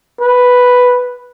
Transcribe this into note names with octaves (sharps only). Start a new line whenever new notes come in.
B4